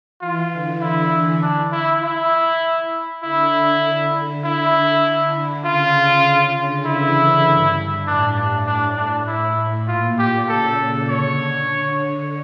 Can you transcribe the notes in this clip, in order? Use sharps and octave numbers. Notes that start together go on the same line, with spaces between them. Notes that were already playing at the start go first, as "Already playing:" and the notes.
E3 F4
D3
E4
D4
E4
E4
D3 E4
D3
D3 E4
C#3 F4
C#3
D3
E3 E4
G2
A2 D4
D4
D4
D4
E4
A#2 F4
G4
C#3 A4
C#3
D3 C#5